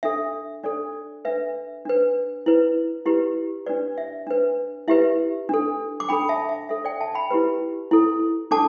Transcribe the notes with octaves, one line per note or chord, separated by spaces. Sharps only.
D4 A4 E5
D4 A4 D5
D4 B4 E5
D4 B4
E4 B4
E4 G4 B4
D4 B4 D5
E5
D4 B4
E4 G4 B4 E5
D4 A4
D6
D4 A4 G5 B5
E5 A5
E5
D4 A4 E5
D5 G5
E5 A5
G5 B5
E4 G4 B4
E4 A4
D4 A4 A5 D6